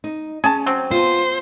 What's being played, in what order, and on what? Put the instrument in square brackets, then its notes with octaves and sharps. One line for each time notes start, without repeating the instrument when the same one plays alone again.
[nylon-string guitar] D#4
[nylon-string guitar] C#4 [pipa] G#4 A5
[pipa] F#3 C4
[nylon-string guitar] B3 F4 [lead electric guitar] C5